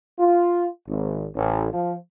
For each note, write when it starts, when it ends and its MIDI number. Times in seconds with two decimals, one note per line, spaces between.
0.19 0.68 65
0.89 1.29 32
1.36 1.69 33
1.74 1.95 53